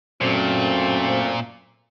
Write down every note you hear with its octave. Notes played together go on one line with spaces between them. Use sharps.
F#2 A#2 A3 C4